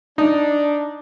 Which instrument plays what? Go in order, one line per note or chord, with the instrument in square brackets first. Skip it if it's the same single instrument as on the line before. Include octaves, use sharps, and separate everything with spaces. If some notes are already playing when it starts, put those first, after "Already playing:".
[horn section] D4 [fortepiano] D#4